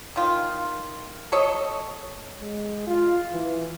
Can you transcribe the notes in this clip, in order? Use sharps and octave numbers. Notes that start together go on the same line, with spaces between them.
D#3 F4
A4 C#5 D#5
G#3
F4
E3